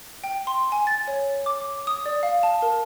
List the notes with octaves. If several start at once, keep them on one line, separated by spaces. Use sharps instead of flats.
G5
C6
G#5
A6
C#5
D6
D#6
D5
F5
A5
A#4